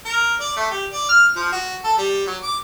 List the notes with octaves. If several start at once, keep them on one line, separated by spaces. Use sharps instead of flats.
A#4
D5
A3
G4
D5
F6
F3
F#4
A4
G3
F#3
D6